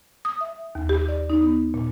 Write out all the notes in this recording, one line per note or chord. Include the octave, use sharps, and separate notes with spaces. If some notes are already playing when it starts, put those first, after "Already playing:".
D#6
E5
D#2
G4
D5
D#4
B3
A#2